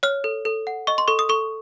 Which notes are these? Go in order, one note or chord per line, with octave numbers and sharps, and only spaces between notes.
C#5 F6
A4
A4
F#5
D#5 C#6
C6
A4 C#6
D#6
A4 C#6